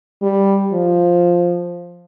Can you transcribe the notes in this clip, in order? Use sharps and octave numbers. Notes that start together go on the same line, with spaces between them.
G3
F3